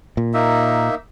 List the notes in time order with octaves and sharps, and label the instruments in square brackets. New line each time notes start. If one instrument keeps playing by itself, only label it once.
[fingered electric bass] A#2
[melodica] A#3 D#4 E5